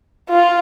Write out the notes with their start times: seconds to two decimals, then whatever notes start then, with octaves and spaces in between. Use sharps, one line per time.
0.29 F4